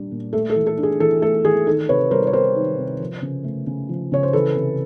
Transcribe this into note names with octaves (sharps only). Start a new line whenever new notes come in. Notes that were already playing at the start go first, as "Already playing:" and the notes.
Already playing: A#2 G3 D4
A#2
A3 A4
A4
E3
A4
D4
G#4
E3 A4
A3 A4
E3 G#4
D#3 A4
C3 B4 C#5
G3 A#4 C5
C#5
C4 A#4 C5
D#3
C3
F3
C#3
A3
C#3
F3
C#3 C#5
C5
E3 A4 B4
C3